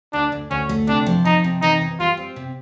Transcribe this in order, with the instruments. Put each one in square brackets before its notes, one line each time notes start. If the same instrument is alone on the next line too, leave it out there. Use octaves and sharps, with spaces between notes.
[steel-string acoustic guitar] D2 [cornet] D4
[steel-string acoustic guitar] D2
[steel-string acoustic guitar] D2 [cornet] C#4
[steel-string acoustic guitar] A3
[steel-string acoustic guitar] C3 [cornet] D4
[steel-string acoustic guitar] F3
[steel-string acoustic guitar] F3 [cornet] D#4
[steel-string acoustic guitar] C3
[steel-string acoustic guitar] E3 [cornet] D#4
[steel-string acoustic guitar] E3
[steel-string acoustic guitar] G3 [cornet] F4
[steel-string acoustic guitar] C4
C3